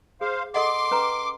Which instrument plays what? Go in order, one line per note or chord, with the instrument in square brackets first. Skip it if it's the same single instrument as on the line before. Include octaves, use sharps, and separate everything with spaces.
[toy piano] G#4 [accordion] C5 F5
[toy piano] A4 D#5 F#5 [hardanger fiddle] C6 [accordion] D6
[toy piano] C#4 B4 A#5